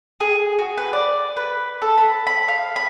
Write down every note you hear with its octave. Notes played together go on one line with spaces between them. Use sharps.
G#4
F#4
B4
D5
B4
A4
B5
B5
F5
B5